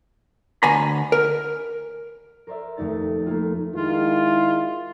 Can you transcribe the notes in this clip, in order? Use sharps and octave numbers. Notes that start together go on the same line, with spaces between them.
D2 G#5 A#5 B5
A#4
A#4 C5 D5 E5
D#1 F2 A3 D#4 A6
A3 A#3 F4
D#3 G#3 E4 F4